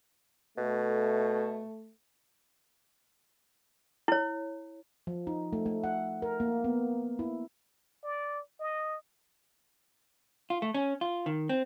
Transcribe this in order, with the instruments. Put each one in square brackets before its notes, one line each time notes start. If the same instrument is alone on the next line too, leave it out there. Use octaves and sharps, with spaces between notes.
[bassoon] B2 [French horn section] A3
[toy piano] E4 C#5
[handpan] F3
D#4
A3
A3
F#5
A#4
A#3
B3
E4
[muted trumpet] D5
D#5
[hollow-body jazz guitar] F4
A3
C#4
F4
D#3
C4